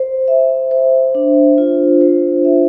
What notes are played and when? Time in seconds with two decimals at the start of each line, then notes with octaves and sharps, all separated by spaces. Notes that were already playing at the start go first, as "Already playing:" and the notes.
Already playing: C5
0.28 E5
0.71 C5
1.15 D4
1.58 F4
2.01 C5
2.45 E5